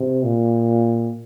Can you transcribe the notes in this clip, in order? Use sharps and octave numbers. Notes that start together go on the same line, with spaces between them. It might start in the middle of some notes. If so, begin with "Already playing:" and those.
Already playing: C3
A#2